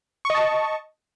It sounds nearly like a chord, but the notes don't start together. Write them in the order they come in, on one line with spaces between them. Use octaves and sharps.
C#6 D#5 A5